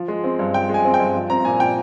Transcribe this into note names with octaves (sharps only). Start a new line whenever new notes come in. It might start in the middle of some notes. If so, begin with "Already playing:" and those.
Already playing: F3
G#3
C4
G2
F3 G5
G#3
G#5
C4
G5
G2
F3
C4 A#5
A#2 G#5
A#2 G5